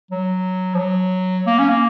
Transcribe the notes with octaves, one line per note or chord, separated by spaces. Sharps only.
F#3
F3
F#3
A#3
C#4
A#3